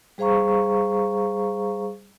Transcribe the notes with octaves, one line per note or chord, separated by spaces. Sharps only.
G3 G#4 C5 F5 A#5 C#6